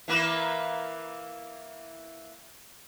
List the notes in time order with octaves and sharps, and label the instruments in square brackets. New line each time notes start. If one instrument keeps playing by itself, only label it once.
[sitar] E3 A#3 B4